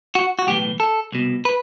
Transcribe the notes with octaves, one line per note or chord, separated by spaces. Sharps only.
F#4
F#4
B1 A2 E3 G4
A4
C2 B2
B4